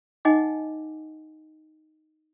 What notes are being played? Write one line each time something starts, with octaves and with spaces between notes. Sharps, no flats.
D#4 D#5 F#5 G#5 D6